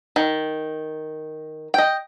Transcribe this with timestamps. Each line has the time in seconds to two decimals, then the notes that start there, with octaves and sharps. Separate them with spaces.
0.16 D#3
1.74 D#5 G5